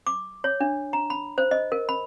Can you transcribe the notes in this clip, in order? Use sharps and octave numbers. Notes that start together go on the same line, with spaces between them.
D6
C#5
D4
A#5
B5
C5
D#5
A#4
B5